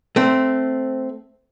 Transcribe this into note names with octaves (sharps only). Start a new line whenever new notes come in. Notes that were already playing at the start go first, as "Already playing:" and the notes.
A3 C4